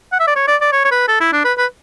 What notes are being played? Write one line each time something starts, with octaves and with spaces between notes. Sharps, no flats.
F#5
E5
D5
C#5
D5
D5
C#5
C#5
B4
A4
E4
D4
B4
B4